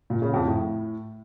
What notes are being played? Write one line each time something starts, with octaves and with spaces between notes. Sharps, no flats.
A#2
C#3
F2
A2